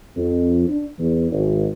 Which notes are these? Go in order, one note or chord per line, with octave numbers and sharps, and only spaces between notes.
F2
D4
E2
G#1